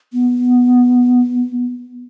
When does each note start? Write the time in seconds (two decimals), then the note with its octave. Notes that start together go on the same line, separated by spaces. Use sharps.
0.13 B3